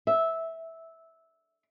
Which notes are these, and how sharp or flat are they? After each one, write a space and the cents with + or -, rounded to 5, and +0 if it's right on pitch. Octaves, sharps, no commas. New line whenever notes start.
E5 -10